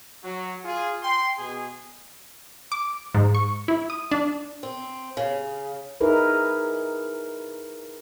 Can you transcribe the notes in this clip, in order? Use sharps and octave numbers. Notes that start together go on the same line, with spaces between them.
F#3
F4 G#4
G5 C6
B2 G#4
D6
G#2
C#6
E4
D#6
D4
C4
C#3
D#4 E4 G#4 A#4 B4